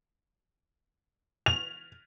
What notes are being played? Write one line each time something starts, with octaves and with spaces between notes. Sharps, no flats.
F7